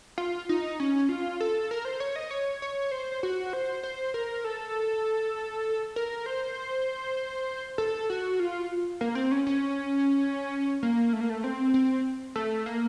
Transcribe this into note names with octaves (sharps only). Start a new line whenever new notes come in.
F4
D#4
C#4
F4
A4
A#4
C5
C#5
D#5
C#5
C#5
C5
F#4
C5
C5
A#4
A4
A#4
C5
A4
F#4
F4
A#3
C4
C#4
C#4
A#3
A3
A#3
A3
C4
C4
A3
A#3